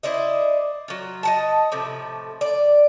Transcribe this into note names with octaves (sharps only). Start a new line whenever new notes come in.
E4 C5 D5 D#5
F#3 F4
D#5 F#5 A5
A2 C3 F3
D5